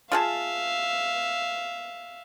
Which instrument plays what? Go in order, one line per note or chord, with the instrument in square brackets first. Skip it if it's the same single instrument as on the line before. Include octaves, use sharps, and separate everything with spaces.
[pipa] F4 G#4 A5 [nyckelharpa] E5 F5